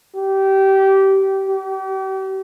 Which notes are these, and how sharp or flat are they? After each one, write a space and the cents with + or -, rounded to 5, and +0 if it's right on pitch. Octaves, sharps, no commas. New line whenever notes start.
G4 -20
G4 -40